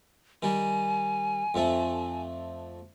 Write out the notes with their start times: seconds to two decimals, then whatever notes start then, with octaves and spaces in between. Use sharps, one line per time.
0.43 D#3 G3 G#5
1.54 F2 A3